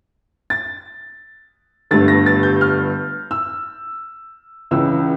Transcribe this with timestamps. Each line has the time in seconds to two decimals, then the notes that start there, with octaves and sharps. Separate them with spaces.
0.50 A6
1.91 G1 G2 D3 A3 A6
2.08 A#6
2.26 A6
2.43 G6
2.61 F6
3.31 E6
4.71 C#2 C#3 E3 E6